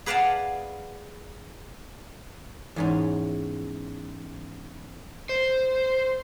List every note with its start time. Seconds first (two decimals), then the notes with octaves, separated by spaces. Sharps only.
0.06 G#4 B4 D5 F5 F#5 A5
2.76 E2 G#2 C#4
5.29 C5